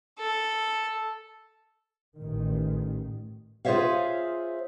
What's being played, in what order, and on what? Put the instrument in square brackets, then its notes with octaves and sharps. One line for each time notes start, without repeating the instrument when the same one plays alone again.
[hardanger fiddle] A4
[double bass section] A1 D#3
[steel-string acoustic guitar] F4 G#4 C5 C#5 E5 F5